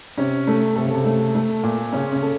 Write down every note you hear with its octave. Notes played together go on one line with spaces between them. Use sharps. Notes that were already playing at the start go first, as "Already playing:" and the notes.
C3 C#4
A3
C3 A4
C#3
C3
A3
A3
A#2
C#3 C#4
C#3
A4